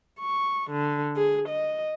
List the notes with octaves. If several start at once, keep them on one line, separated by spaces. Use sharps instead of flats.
C#6
D3
G#4
D#5